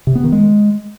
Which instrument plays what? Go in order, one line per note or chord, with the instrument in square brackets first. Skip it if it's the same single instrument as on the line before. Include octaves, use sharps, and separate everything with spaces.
[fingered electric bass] C3
B3
D#3
G#3